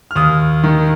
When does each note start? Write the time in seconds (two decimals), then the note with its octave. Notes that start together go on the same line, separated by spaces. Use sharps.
0.11 F6
0.15 D#2 D#6
0.64 D#3